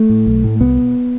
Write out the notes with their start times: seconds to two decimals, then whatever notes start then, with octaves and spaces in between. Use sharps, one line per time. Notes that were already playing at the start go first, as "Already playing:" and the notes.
Already playing: A3
0.10 A2
0.26 B1
0.44 A2
0.60 C2 B3
0.77 B2